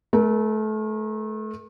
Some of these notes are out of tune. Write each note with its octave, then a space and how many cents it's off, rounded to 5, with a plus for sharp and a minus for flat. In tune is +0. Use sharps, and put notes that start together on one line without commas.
A3 -30 A#4 +25